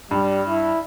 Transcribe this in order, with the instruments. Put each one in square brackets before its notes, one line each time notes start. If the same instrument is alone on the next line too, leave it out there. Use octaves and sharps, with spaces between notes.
[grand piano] G2 [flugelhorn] G3
[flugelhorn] E4